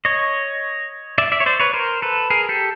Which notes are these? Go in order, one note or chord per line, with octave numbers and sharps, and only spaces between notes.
C#5 D#5
D5 E5
D5 E5
C#5
C5 D5
B4 C#5
A#4 C5
A4 B4
G#4 A#4
G4 A4